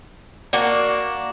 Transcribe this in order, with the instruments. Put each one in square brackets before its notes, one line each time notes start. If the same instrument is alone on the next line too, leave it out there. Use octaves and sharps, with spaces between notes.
[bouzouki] A#3 D4 F#4 [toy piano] D5